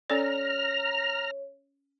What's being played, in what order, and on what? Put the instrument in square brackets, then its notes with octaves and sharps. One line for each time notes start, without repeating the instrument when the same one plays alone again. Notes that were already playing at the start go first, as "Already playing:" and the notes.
[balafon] C#4 A4 D5 [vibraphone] C#5 [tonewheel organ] A#5 F6